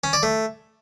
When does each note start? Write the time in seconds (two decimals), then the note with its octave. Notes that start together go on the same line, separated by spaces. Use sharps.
0.04 C#4
0.13 D5
0.23 A3